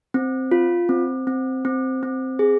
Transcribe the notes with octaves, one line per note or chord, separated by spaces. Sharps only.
C4
F4
C4
C4
C4
C4
G#4